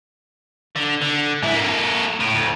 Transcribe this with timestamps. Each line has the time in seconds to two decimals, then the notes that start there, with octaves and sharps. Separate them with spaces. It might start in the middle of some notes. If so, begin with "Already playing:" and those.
0.76 D3
1.02 D3
1.42 G#2 E4
1.55 A#3 A4
2.20 A2
2.34 D2